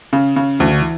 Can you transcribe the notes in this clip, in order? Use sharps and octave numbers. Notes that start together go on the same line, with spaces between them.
C#3
C#3
D2 E3
D3
E3